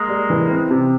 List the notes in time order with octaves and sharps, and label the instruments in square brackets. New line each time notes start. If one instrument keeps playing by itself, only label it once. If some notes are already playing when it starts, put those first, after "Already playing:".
Already playing: [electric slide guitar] G#3 A#3
[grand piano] G3
E3
C4
C3